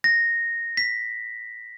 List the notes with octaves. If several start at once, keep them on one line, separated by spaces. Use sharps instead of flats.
A#6
B6